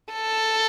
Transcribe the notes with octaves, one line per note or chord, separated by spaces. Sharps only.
A4